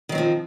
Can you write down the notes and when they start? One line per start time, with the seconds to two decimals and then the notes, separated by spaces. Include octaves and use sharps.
0.09 D#3
0.12 F#3
0.15 C4
0.18 F3